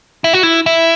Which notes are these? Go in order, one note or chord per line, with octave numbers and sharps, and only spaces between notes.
E4
F#4
E4
E4